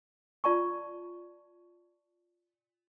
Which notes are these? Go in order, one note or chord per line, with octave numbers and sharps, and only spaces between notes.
F4 D5 A5 C#6